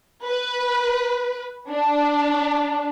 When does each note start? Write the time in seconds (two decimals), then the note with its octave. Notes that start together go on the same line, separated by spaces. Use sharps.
0.23 B4
1.69 D4